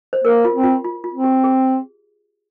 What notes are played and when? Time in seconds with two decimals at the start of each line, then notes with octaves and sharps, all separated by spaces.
0.13 C5
0.24 A#3 A#4
0.45 F4
0.54 C4
0.64 F4
0.84 F4
1.04 F4
1.14 C4
1.24 G4
1.44 G#4